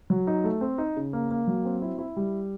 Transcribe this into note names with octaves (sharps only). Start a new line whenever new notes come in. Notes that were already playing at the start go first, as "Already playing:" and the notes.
F#3
D#4
A3
C4
D#4
C#3
A#3
A#3
F#3
C4
E4
E4
G3